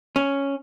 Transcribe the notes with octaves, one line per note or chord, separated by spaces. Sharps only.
C#4